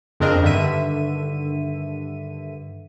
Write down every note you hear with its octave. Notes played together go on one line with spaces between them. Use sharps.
F2 C#3 C4 D4 A#4 D#5
G2 D3 D#3 E5 D#7